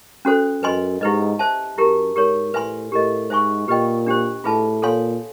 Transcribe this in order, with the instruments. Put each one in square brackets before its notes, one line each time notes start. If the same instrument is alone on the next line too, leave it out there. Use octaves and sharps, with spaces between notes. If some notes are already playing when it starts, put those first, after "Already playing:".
[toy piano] C#4 F#4 A4 C5
[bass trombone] F#2 [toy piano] B4 D#5 G#5 C6
[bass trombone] G#2 [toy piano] E4 G4 B4 D#5
[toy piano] C5 E5 A5
[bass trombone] F#2 [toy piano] E4 G4 A#4
[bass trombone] G#2 [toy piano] G4 A#4 C#5
[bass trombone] A2 [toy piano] B4 E5 G#5 C6
[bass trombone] A2 [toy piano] G4 A#4 D#5
[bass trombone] G#2 [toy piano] C5 E5 G#5 C#6
[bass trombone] A#2 [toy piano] G4 B4 D#5 G5
[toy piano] D4 G4 C5
[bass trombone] A2 [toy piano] F4 G#4 B4 E5 A5
[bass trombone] A#2 [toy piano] A4 C#5 F5 G#5 C6